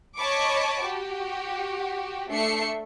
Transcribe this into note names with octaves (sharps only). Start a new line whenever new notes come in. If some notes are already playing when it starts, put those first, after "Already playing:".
C#5 D#5 A5 B5 C#6 D6
F#4 G4
A3 D4 A4 E5 C7 C#7